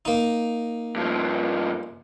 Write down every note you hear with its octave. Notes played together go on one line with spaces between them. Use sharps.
A#3 D#4
G2 F3